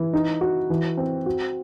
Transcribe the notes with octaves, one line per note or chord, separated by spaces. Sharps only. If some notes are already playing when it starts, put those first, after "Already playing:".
Already playing: E3
D#4
F#4
E3
C4
F#4